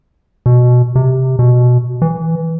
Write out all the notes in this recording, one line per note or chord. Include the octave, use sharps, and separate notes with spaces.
B2
C3
B2
E3